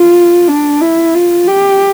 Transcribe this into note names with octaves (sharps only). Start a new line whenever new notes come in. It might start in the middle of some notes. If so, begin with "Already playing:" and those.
Already playing: F4
D4
E4
F4
G4